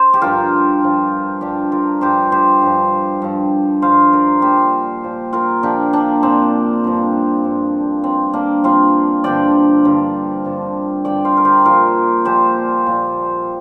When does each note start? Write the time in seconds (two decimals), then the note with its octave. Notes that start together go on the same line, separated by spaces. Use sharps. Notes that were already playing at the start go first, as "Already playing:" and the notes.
Already playing: C5
0.14 G4
0.21 G2 F3 F4 A#4
0.82 G2 F3
1.41 G2 F3 D4 G4
1.72 F4 A#4
2.01 G2 F3 G4 C5
2.32 G4 C5
2.62 G2 F3
3.22 G2 F3
3.82 G2 F3 C5 F5
4.13 A#4 D5
4.42 A#2 F3 G4 C5
5.04 A#2 F3
5.33 F4 A#4
5.63 A#2 F3 D4 G4
5.93 A#3 D4
6.23 A#2 F3 C4
6.84 G2 F3
7.44 G2 F3
8.04 G2 F3 C4
8.34 A#3 D4
8.64 G2 F3 C4 F4
9.24 G2 D3 F3 D5 G5
9.84 G2 D3 F3
10.44 G2 D3 F3
11.05 G2 D3 F3 D5 G5
11.25 C5 F5
11.37 A#4
11.45 G4 C5
11.65 A#2 F3 F4 A#4
12.25 A#2 F3 G4 C5
12.86 A#2 F3